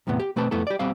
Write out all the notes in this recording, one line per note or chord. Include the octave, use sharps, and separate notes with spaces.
E2 A2 C3 B3
G4
B2 A3 C4 B4 A5
F2 A3 B3 E4 A4
G4 D5
B1 B2 G3 C4 F5